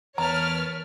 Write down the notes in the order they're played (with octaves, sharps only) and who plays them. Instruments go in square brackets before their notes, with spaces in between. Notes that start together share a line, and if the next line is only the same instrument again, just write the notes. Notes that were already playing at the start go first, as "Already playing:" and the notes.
[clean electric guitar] E2 [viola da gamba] A#4 B4 [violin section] C#5 A5 F6 [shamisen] A#5